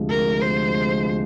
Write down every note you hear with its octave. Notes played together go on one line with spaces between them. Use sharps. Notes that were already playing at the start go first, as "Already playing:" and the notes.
Already playing: D2 C3 F3 G#3
A#4
C5